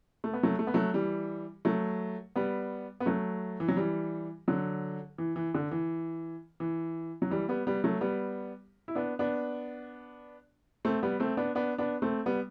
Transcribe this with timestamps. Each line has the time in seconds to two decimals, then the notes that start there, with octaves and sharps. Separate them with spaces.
0.24 A3
0.33 B3
0.43 F#3 A3
0.59 A3
0.67 B3
0.74 F#3 A3
0.94 E3 G3
1.65 F#3 A3
2.36 G3 B3
3.00 B3
3.06 F#3 A3
3.60 E3
3.68 F#3
3.77 E3 G3
4.48 D3 F#3
5.18 E3
5.36 E3
5.54 D3
5.71 E3
6.60 E3
7.22 F#3
7.30 E3 G3
7.49 G3 B3
7.67 G3 B3
7.84 F#3 A3
8.01 G3 B3
8.88 E4
8.95 B3 D4
9.19 B3 D4
10.85 A3 C4
11.03 G3 B3
11.20 A3 C4
11.37 B3 D4
11.55 B3 D4
11.78 B3 D4
12.02 A3 C4
12.26 G3 B3